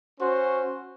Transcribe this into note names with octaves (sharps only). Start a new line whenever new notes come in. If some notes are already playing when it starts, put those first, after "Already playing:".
C#4 F#4 C5